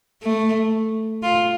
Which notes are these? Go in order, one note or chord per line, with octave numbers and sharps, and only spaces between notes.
A3
F4